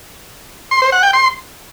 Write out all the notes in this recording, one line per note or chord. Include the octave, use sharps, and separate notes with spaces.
C6
C5
F#5
G5
C6